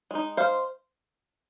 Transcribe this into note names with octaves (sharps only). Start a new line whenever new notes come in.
G#3 D#4
C5 F5